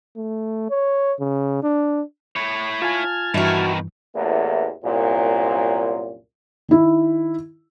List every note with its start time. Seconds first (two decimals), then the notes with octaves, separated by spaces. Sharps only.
0.16 A3
0.70 C#5
1.20 C#3
1.63 D4
2.36 E4 C#5
2.82 F4 G#5 A5 F6 G#6
3.34 G2 B2 D#3 E3 E4 F#4
4.14 A1 E2 A3 A#3
4.83 C2 F#2 A#2
6.69 D#3 E4